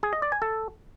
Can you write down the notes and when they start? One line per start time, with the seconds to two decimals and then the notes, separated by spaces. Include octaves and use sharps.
0.03 G#4
0.13 D#5
0.22 D5
0.32 G#5
0.42 A4